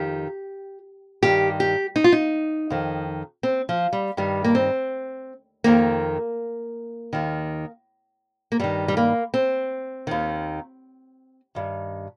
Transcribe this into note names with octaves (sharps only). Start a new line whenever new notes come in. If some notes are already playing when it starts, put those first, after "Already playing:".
Already playing: F2 D#3 G4
G2 D#3 G4
G4
D#4
F4
D#4
F2 D#3
C4
F3
G3
G2 D#3 G3
A#3
C4
F2 D#3 A#3
D#2 D#3
A#3
G2 D#3 G3
G3
A#3
C4
D#2 D#3
G2 D#3